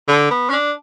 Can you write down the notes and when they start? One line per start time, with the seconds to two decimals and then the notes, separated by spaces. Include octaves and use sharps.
0.08 D3
0.31 B3
0.50 C#4
0.53 D4